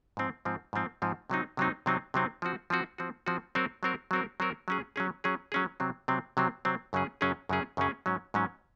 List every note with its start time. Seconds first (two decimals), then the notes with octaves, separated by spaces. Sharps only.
0.17 G#2 F3 C4
0.45 G#2 F3 C4
0.73 G#2 F3 C4
1.02 G#2 F3 C4
1.30 C3 F#3 C4 D#4
1.57 C3 F#3 C4 D#4
1.86 C3 F#3 C4 D#4
2.14 C3 F#3 C4 D#4
2.42 F3 C4 F#4
2.70 F3 C4 F#4
2.98 F3 C4 F#4
3.26 F3 C4 F#4
3.55 F#3 C4 F#4 A#4
3.83 F#3 C4 F#4 A#4
4.11 F#3 C4 F#4 A#4
4.40 F#3 C4 F#4 A#4
4.68 F#3 C#4 G#4
4.96 F#3 C#4 G#4
5.24 F#3 C#4 G#4
5.52 F#3 C#4 G#4
5.80 C3 F#3 C4
6.08 C3 F#3 C4
6.37 C3 F#3 C4
6.65 C3 F#3 C4
6.93 F#2 C#3 F#3 C#4 G#4
7.21 F#2 C#3 F#3 C#4 G#4
7.49 F#2 C#3 F#3 C#4 G#4
7.77 F#2 C#3 F#3 C#4 G#4
8.06 G#2 F#3 C#4
8.34 G#2 F#3 C#4